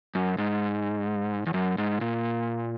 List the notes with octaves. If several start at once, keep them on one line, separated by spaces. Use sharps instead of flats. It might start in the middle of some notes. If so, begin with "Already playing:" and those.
F#2
G#2
E2
F#2
G#2
A#2